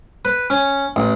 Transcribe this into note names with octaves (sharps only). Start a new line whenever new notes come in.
B4
C#4
A1